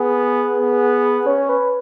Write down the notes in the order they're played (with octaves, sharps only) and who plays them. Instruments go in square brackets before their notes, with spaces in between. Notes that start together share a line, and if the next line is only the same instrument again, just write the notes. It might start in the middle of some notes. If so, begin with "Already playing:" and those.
Already playing: [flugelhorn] B3 [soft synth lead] G#4
[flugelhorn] B3
[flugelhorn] C#4 [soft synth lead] C#5
[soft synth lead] B4